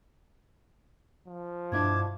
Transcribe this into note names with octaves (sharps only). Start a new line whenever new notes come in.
F3
G2 B2 D4 E4 A5 D6 G#6